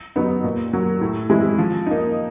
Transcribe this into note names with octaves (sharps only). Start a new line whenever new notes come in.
F#3 B3 D#4
A#2
F#3 A#3
A2
E3 G#3 C4 E4
F3
A#3 D#4